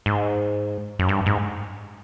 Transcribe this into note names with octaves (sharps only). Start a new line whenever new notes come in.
G#2
F#2
G2
G#2